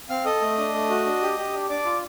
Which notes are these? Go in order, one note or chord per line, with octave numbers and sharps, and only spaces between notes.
C4 F5 F6
A4 D#5 D#6
A3
D4
A3
F#4
D4
G4
G4
D4
D4 D5 D6
F4